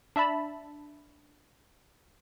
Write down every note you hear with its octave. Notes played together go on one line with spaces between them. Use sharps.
D4 E5 A5 B5